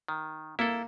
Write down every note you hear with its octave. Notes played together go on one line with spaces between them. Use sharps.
D#3
A#3 E4 A4